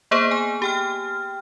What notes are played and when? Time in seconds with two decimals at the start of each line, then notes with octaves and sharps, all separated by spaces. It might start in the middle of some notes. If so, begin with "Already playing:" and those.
0.11 A#3 B3 G#4 C5
0.31 G#5
0.62 G4 G5 F6